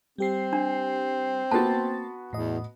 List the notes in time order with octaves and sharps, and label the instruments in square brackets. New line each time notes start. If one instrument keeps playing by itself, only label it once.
[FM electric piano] G3 G4 C7 [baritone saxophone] C4
[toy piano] D4
[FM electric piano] A#3 C6 A6 [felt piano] B3 F#4 [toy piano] A5
[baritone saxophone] E2 [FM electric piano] A2 D#5